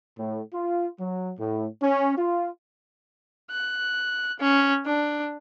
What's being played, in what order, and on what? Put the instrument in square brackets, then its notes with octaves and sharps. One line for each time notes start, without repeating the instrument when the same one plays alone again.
[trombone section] A2
F4
F#3
A2
C#4
F4
[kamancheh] F#6
C#4
D4